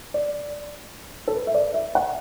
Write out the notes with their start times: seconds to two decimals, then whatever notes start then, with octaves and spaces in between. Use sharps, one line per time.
0.14 D5
1.28 A4
1.35 B4
1.47 E5
1.54 D5
1.74 E5
1.95 F#5